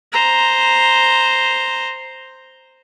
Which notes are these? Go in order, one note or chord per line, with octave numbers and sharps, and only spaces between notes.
C5 A#5